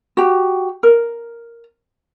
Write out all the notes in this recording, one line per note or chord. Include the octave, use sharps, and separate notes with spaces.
F#4 G4
A#4